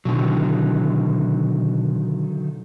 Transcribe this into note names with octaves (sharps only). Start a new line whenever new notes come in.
B2 D3 D#3 F#3